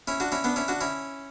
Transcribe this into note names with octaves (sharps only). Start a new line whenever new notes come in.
C#4 E4
D4 F#4
C#4 E4
B3 D4
C#4 E4
D4 F#4
C#4 E4